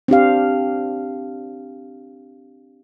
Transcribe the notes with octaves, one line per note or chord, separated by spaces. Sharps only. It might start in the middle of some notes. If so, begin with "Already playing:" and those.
C4 D4 G4 F5